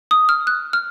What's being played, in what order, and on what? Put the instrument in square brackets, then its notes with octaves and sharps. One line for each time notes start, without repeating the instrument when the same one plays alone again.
[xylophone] D#6
F6
F#6
F6